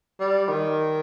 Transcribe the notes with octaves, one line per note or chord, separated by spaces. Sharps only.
G3
D#3